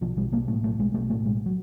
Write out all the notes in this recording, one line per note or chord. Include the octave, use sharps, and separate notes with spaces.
B1 F3
B1 G3
B1 A#3
A2 A3
B1 A3
B1 G#3
B1 A3
A2 A3
B1 G#3
F#3